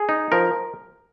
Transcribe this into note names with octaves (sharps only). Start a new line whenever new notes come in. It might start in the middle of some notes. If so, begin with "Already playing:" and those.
Already playing: G#4
D#4
F3 A#4